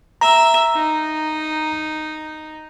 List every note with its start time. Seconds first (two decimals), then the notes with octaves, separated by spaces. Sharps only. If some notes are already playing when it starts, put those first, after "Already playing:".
0.21 E5 A#5
0.75 D#4